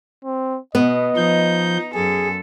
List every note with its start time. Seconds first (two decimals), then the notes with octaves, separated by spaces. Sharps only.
0.25 C4
0.75 B2 B3 D#5
1.17 F3 D#4 G6
1.94 F#2 G#4 A4